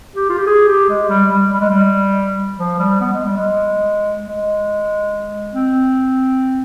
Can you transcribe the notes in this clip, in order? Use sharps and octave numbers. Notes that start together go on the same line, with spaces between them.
G4
F4
G4
G#4
G4
G#3
G3
G3
G3
G#3
G3
F3
G3
B3
G#3
G3
G#3
G#3
C4